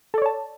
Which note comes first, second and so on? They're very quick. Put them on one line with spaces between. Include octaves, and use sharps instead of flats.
A4 D5 C#5 A5